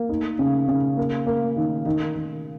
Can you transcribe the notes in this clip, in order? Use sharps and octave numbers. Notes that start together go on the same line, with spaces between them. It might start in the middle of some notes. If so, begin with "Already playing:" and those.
Already playing: A#3
D#4
C#3
C#3
A#3
A#3
D#3
D#3
D#3